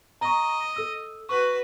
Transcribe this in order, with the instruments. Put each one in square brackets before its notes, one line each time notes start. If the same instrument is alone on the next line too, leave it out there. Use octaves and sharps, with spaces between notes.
[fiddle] D#5 [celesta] A#5 C#6
[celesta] A4 E6
[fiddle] F#4 B4 [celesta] C#6